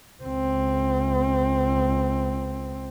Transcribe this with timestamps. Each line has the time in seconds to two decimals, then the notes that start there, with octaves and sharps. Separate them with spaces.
0.23 C#2 C4